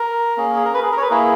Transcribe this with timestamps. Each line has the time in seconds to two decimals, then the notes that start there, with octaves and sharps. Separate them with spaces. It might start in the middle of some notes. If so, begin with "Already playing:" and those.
Already playing: A#4
0.37 A#3 C#4 G#4
0.56 G#4
0.65 A#4
0.74 B4
0.83 G#4
0.92 A#4
0.97 C#5
1.02 B4
1.10 A#3 E4 G#4 A#4